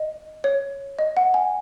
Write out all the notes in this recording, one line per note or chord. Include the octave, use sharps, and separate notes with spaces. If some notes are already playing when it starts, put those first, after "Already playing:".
Already playing: D#5
C#5
D#5
F#5
G#5